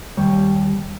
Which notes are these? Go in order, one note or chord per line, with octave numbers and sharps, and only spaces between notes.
D#2 G3 C#5